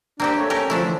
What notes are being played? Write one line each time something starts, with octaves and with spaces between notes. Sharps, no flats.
A#3 C4 D4 G4
A3 C#5
C#4 G4 A#4
D3 F3 A3 D4 E4
E3